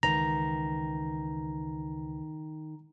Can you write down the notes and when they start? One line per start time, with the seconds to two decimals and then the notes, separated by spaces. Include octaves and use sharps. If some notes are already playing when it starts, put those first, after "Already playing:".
0.03 C#2 D#3 E3 A#5